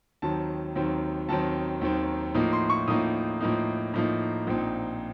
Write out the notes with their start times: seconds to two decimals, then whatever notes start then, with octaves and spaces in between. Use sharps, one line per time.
0.22 D#2 D#3 F#3 C4 A5
0.75 D#2 D#3 F#3 C4
1.29 D#2 D#3 F#3 C4 A5
1.81 D#2 D#3 F#3 C4
2.34 A2 F3 A#3 D#4
2.53 C6
2.70 C#6
2.88 A2 F3 A#3 D#4 D#6
3.41 A2 F3 A#3 D#4
3.94 A2 F3 A#3 D#4
4.47 A#1 A#2 F3 C4 D#4